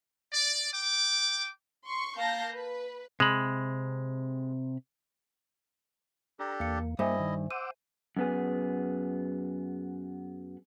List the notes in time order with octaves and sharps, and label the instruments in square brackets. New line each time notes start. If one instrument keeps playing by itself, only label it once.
[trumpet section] D5
G5 D6
[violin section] C6 C#6
A#3 F5 A5 G6 A#6
B4
[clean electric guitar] C3 B5 [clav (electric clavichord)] G#3
[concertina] D4 G4 A4 [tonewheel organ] A#5
[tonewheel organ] E2 A#3 [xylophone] F5 C#7
[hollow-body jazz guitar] G2 [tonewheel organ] A#3 [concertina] E4 D#5 [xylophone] C5 E5 G#5
[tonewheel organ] D#3
[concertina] C5 [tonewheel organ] F#5 D6 E6 [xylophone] D#7
[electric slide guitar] F#2 B3 G#4